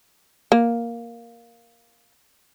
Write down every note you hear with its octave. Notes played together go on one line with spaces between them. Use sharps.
A#3